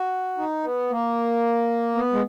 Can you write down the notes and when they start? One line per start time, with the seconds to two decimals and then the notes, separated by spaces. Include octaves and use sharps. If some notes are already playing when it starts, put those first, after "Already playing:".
Already playing: F#4
0.38 D#4
0.64 B3
0.91 A#3
1.95 B3
2.13 G#3